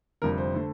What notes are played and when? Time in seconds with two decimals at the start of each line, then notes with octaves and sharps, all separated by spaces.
0.22 F1 F2 D3 G3 A#4
0.38 C5
0.55 D3 A3